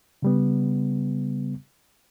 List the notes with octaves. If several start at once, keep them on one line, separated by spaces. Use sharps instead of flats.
C#3 G3 B3